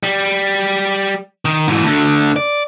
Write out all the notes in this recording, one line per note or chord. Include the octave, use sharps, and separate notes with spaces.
G3
D#3
G#2 E3
D2 D3
D5